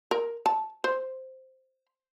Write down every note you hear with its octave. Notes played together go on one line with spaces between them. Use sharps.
A#4
A5
C5